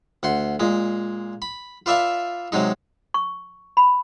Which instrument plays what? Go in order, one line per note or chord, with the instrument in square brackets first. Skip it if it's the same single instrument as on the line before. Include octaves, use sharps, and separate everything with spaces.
[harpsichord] D2 F#5 C6
A#2 G#3
B5
F4 B4 D5 E5 F5 A5
C3 F#3 G#3 D#4
[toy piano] C#6
B5